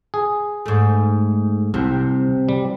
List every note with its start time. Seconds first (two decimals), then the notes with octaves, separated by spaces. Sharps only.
0.14 G#4
0.66 G#2 A3
1.74 C2 C3
2.49 G3